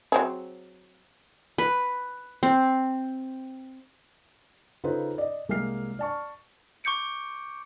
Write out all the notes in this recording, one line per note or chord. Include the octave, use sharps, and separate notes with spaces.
F#3 C4 G#4
B4
C4
C#3 D#4 F4 A4 B4 C5
D5 D#5
C2 G#3 A#3 E5 F6 C7
D5 A5 C#6
C#6 D6 G6 C#7 D7